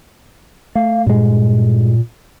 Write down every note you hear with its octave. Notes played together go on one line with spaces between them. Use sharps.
A3 F5
G2 A#2 G#3